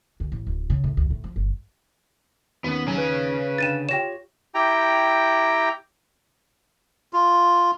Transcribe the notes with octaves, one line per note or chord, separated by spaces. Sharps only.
D2
A1
D1
C#3
A2
D2
A2
F3
G1
D#2 B3 C#4
C#3 F#3 G#5
B4
D3 G5 A6 D#7 E7
F4 G4 C#5 G5 A#6 E7
E4 G4 G5 A#5
F4